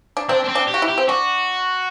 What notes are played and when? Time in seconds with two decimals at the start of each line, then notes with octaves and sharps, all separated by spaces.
0.17 D4
0.29 C4 D4
0.44 D4
0.49 C4
0.55 D4
0.68 G4
0.74 F#4
0.82 E4
0.89 G4
0.98 C4
1.09 D4 F#4